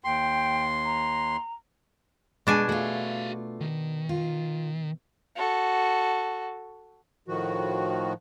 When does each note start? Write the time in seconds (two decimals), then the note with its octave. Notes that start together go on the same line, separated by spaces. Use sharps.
0.04 D#2 G5 C6
0.85 A#5
2.47 B2 G#3 D4 G#5
2.69 A3 F4 F#4 F5
3.61 D#3
4.09 F4
5.36 F#4 A4
7.28 A2 D#3 F3 F#4